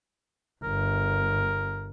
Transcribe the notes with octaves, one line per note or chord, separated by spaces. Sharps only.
G1 A#4